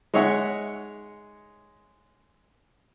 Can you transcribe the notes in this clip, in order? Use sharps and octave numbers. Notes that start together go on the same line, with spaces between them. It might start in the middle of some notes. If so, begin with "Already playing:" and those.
G#3 D#4 C#5 E5 F#5